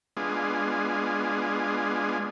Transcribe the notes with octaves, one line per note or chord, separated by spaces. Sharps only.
G#3 B3 D4 F4 G#4